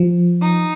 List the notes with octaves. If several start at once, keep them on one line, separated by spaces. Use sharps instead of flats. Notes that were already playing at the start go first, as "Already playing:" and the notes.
Already playing: F3
D#4